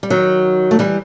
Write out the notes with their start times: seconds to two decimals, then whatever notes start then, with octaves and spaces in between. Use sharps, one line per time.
0.03 G3
0.10 D#3 F#3
0.71 A3
0.79 E3 G3